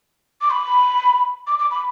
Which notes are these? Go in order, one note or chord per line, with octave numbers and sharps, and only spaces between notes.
D6
B5
D6
D6
B5